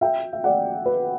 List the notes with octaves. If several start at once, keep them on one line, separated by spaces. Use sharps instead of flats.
E5 G5
E5
D5 F#5
B4